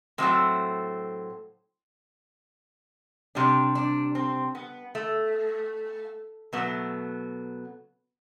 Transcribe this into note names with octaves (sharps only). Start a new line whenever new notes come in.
A2 F#3 A3 C4
C3 G3 D4
D4
C4
B3
A3
B2 F#3 A3 B3